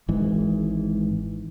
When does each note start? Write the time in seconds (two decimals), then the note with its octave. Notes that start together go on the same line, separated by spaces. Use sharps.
0.08 G#1 G#2 E3